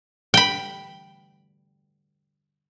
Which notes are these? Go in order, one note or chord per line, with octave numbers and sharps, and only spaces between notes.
G5 B5